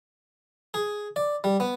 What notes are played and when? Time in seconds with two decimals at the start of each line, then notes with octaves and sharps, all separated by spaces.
0.74 G#4
1.16 D5
1.44 G3
1.60 B3